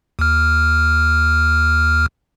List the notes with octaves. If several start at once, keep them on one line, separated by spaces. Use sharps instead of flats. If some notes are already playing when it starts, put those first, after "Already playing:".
D#2 F6